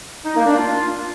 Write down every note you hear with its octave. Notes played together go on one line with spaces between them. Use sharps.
D#4
A#3
D4
F4